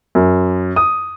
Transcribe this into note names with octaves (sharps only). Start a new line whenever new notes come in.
F#2
D#6